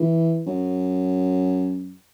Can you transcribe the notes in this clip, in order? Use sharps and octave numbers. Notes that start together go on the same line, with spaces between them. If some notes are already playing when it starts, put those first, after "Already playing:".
Already playing: E3
F#2